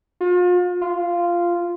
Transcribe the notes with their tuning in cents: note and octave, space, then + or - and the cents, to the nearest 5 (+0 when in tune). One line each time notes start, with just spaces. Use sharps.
F4 +40
F4 -10